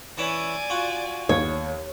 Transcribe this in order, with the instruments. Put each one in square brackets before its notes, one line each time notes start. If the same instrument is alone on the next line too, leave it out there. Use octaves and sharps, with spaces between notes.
[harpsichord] E3 C#4 E4 [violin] D5 G#5
[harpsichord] F4 F#4
[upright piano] D#2 [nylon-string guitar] C#5